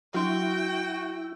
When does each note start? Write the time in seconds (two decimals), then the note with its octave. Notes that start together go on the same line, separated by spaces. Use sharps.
0.14 F#3 D4 E4 F#4 G5 C6